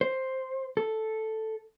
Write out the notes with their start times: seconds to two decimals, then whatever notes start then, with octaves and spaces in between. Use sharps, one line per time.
0.01 C5
0.77 A4